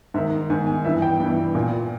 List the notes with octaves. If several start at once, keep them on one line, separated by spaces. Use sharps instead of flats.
G#2 D#3 E5
G#2 D#3 G#5
G#5
G2 E3 E5
G5
G2 E3
A#2 G#5